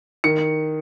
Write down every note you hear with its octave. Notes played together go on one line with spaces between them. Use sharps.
D#3 C#7